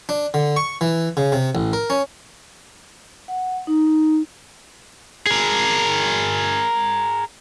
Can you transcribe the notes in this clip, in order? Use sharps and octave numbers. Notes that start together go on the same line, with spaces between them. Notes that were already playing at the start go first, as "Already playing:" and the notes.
D4
D3
C#6
E3
C#3
C3
A1
A#4
C#4
F#5
D#4
D#4
G#4 A#4